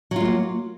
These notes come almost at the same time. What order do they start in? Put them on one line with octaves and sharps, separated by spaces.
F#3 F4 G#3 A#3